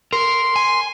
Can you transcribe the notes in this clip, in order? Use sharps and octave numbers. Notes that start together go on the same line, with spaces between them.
A#4 C6
G#5